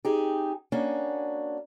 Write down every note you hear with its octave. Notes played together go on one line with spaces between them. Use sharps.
C4 D#4 G4 G#4
A#3 C#4 D4 F#4 G#5